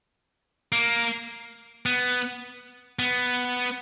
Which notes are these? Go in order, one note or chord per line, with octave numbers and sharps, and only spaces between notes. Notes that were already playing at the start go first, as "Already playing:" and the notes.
A#3
B3
B3